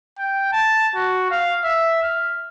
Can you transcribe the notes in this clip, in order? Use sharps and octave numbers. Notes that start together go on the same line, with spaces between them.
G5
A5
F#4
F5
E5
F6